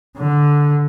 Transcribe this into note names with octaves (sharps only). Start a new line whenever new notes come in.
D3